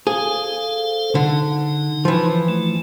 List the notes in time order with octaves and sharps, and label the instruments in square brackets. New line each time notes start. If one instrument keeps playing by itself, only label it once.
[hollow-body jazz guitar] G#4 [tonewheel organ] A4 C5 F5
[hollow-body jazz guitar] D3 [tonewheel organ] D#4
[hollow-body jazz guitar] E3 F3
[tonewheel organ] A3